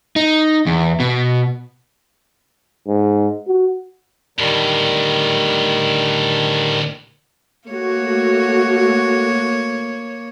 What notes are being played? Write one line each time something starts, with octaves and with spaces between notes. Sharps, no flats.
D#4
E2
B2
G#2
F#4
D2 A2 D#3 G3
A3 A#3 F#4 C#5